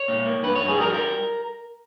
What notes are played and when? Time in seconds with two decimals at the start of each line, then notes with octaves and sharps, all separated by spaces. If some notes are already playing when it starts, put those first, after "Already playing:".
Already playing: C#5
0.08 A#2
0.25 A#3
0.43 G2 B4
0.55 G2 C#5
0.68 G#4
0.77 G3 A#4
0.94 A#4